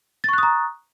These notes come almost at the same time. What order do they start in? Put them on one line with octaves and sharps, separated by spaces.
A6 C#6 F#6 D#6 A#5